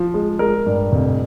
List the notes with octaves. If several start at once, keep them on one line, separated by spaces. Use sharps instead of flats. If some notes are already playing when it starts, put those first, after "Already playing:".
Already playing: F3
G#3
G#3 A#4
G2
F1